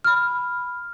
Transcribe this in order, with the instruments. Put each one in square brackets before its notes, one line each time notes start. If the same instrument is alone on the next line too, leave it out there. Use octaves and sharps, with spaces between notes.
[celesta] B5 F6